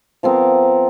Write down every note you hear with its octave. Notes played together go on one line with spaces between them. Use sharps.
F3 B3 C4 A#4